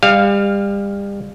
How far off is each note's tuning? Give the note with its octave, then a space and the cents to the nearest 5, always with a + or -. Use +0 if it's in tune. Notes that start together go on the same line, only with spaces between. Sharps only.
G3 +35 F5 +0